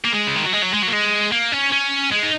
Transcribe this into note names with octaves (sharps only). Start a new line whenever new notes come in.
A#3
G#3
C#3
D#3
F#3
G#3
F#3
G#3
F#3
A#3
G#3
A#3
C#4
C#4
G#3
D#4